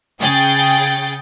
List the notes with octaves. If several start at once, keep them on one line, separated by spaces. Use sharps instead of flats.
C#3 G#4 G5 A6